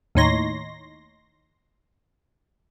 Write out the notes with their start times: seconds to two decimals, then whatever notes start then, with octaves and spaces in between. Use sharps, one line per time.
0.15 D#2 A2 D#4 C#5 C6 A#6